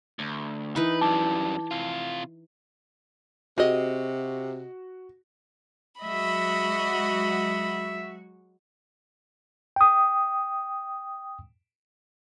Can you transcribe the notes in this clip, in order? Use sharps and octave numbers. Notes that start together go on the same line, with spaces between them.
D2
E3 D#4 B4
F#2 G3 A5 D6
C3 F4
C3 F#4 G#4 D#5
F#3 G#3 F#4 D#5 E5 B5
G5 D#6